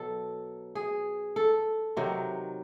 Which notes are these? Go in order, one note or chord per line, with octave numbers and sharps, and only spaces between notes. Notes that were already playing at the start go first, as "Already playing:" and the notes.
Already playing: B2 F#3 A4
G#4
A4
C3 D#3 F#3